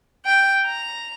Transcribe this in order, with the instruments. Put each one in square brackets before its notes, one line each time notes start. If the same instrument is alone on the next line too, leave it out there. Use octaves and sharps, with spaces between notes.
[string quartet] G5
A#5